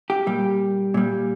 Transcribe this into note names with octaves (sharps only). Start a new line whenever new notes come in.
G4
A#2 G3
A#2 G3